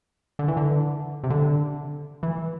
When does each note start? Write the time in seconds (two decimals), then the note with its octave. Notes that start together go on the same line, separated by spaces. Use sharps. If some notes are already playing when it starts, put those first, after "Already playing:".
0.39 D3
0.48 E3
0.57 D3
1.24 C3
1.30 D3
2.23 E3